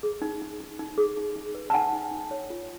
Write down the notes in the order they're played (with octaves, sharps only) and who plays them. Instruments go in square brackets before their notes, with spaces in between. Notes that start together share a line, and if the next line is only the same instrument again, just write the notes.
[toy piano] G#4
D#4
D#4
D#4
D#4
G#4
D#4
D#4
B4
A5
D#4 F#5 G#5
D#4
D#4
C#5
F4